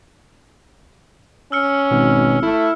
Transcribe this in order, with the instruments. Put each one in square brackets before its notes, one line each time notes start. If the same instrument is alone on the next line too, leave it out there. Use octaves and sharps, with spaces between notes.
[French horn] C#4 [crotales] E6 F6 C#7
[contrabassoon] G#1 [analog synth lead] B2
[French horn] A3 [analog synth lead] E4